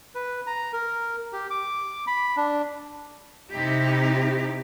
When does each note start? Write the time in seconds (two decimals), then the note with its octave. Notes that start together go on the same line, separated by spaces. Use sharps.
0.15 B4
0.47 A#5
0.73 A#4
1.33 G4
1.50 D6
2.07 B5
2.37 D4
3.52 C3 D#4 E4 G4